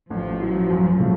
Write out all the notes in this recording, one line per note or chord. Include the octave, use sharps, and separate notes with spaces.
A1 F3
A2 F#3
F#2
C#3 F3 A3